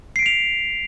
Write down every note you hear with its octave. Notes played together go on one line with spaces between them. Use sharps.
B6 C7 D7 F7